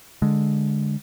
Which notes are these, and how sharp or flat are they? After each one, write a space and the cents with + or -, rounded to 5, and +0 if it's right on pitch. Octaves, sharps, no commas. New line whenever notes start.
D3 +0 G#3 +0